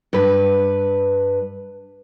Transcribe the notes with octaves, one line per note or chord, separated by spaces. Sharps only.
G2 B4